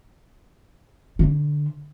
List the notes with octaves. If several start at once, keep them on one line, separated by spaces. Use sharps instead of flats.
D3